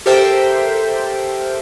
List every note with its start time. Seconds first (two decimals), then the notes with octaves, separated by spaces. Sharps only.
0.06 G4 A4 A#4 C5 E5 G5